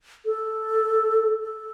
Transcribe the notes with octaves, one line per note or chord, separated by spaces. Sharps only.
A4
A4